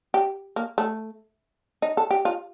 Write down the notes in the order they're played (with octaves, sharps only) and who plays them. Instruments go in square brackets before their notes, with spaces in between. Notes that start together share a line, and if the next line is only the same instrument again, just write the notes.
[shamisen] G4
A#3
A3
D#4
A4
G4
F4